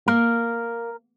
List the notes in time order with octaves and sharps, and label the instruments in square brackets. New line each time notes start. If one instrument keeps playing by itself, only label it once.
[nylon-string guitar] A#3 [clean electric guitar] A#4